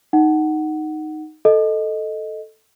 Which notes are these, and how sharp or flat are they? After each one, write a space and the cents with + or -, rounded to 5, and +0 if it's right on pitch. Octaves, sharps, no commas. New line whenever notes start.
D#4 -5 F#5 +10
A4 +0 D#5 +0